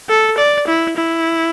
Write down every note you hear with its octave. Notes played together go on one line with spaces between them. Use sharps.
A4
D5
E4
E4